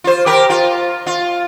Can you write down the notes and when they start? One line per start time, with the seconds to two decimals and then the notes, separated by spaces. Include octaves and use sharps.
0.04 F4 C5
0.26 G4 A#4
0.50 F4
1.06 F4